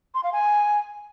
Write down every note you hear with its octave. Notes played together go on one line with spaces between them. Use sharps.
C6
F5
G#5